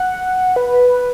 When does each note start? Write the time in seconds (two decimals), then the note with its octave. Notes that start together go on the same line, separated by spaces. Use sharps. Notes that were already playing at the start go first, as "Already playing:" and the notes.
Already playing: F#5
0.56 B4